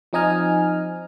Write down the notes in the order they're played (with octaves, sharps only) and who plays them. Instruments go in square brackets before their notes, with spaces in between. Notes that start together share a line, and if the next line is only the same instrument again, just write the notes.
[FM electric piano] F3 C4 D#4 D#5 G#5 F6